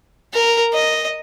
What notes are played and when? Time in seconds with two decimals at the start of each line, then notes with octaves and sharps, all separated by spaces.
0.34 A#4
0.73 D#5